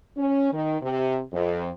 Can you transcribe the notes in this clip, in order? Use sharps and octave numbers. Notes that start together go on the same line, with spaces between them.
C#4
D#3
C3
F2